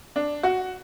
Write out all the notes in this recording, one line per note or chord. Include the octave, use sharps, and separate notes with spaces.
D4
F#4